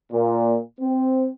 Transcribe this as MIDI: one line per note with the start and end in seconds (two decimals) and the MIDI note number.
0.13 0.57 46
0.81 1.30 60